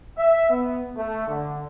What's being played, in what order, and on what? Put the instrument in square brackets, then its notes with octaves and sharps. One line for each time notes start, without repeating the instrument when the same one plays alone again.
[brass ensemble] E5
B3
A3
D3